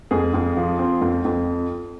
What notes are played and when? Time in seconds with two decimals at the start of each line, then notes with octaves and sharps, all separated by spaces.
0.11 F2 G#4
0.34 F2
0.57 F3
0.79 C4
1.01 F2
1.25 F2